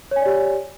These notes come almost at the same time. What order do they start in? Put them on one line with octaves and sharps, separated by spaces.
C#5 G#5 D5 G4